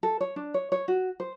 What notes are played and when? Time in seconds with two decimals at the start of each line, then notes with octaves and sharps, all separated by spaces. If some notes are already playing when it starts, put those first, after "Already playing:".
0.03 A4
0.21 C#5
0.36 D4
0.54 C#5
0.72 C#5
0.88 F#4
1.20 C5